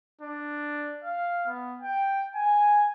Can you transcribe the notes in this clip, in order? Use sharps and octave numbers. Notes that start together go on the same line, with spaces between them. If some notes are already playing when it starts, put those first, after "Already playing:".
D4
F5
B3
G5
G#5